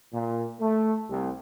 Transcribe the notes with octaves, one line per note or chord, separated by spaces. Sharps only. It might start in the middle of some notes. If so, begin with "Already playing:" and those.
A#2
A3
C2